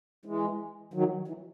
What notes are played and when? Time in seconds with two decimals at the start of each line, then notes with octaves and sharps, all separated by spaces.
0.25 E3 G#3
0.94 D#3 F#3
1.28 E3